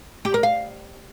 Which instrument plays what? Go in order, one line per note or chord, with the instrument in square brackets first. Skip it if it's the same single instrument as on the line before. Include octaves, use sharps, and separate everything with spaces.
[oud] G4
A#4
F5